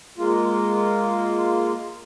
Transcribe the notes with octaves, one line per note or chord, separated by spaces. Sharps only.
G#3 A#3 F4